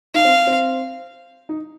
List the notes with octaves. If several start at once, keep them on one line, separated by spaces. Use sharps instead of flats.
D#4 F5
C4
C4
D#4